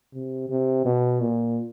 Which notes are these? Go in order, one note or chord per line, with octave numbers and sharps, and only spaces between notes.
C3
C3
B2
A#2